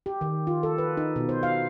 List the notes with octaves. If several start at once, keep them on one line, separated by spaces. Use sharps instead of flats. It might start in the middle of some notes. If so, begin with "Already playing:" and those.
G4
D#3
F4
A4
B4
D#4
B2
C5
F5